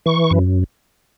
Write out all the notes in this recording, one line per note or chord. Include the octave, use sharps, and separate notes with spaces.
E3 C#6
F#2